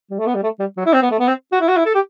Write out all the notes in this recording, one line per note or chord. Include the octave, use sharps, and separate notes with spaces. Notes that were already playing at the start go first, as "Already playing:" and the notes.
G3
A3
B3
G3
A3
G3
F#3
E4
C4
B3
A3
B3
C4
F#4
E4
F#4
E4
A4
G4